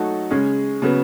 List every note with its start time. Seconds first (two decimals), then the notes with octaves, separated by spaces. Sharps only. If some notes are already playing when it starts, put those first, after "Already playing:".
Already playing: F#3 A3 D#4 F#4 A4
0.31 C#3 G#3 C#4 G#4
0.82 C#3 F#3 B3